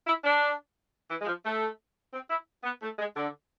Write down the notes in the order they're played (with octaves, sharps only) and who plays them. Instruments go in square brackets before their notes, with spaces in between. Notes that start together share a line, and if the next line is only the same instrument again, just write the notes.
[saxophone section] E4
D4
E3
G#3
F3
A3
C4
E4
B3
A3
G#3
D3